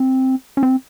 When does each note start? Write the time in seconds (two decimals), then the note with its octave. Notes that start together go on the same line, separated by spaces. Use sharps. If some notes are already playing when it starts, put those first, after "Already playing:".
Already playing: C4
0.57 C#4
0.63 C4